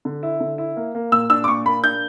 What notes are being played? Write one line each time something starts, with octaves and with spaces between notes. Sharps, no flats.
D3
E4
D3
E4
A#3
A#3
A#2 E6
D4 E6
D6
A#2 C#6
A#3 B5
D4 G6